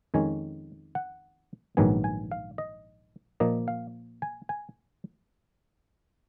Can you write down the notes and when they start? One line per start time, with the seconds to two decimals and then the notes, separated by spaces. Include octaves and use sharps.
0.14 F2 D#3 G#3 C#4 G#5
0.95 F#5
1.77 A#1 G#2 D#3 F#3 B3 G#5
2.04 G#5
2.32 F5
2.58 D#5
3.40 A#2 F3 A#3 D#5
3.68 F5
4.22 G#5
4.49 G#5